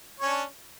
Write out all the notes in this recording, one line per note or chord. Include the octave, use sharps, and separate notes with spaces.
C#4 D4 C#5